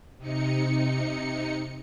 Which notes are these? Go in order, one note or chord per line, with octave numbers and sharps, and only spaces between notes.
C3 D#4 C#7